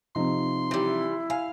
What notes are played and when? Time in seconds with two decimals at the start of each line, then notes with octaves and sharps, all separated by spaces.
0.16 C3 F3 D#4 C6
0.71 E3 G3 E4
1.30 F5 G#5